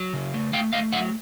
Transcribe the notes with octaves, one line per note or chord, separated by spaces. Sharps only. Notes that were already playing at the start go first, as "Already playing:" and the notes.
Already playing: F#3
C#3
A3
A3 F5 G5
A3 D#5 F5
F#3 E5 F#5